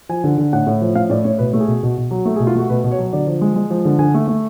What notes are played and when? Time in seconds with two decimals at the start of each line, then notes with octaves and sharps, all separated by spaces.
0.09 F3 G#5
0.24 D3
0.38 D3
0.53 A2 F#5
0.67 A2
0.81 F3
0.95 A2 F5
1.10 A2 D5
1.24 A2 C#5
1.39 B2 B4
1.53 A3
1.60 G#4
1.68 B2
1.83 B2
1.98 B2
2.11 F#3
2.26 A3 A4
2.36 G#4
2.40 B2
2.47 F4
2.55 A3 F#4
2.69 B2 B4
2.84 B2
2.92 C#5
2.99 F#3
3.13 D3 D5
3.27 F3
3.41 G#3
3.56 G#3
3.70 F3
3.85 D3
3.99 D3 G#5
4.14 A3
4.28 A3